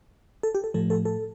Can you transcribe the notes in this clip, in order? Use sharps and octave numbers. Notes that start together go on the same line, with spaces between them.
A4
G4
A4
A2 F3 A3 A4
A4
A4